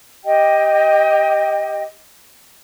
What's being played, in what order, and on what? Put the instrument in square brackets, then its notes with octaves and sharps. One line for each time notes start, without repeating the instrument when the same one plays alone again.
[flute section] G4 D#5 G5